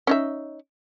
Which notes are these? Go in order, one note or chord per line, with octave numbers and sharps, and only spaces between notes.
C#4 D#4 E5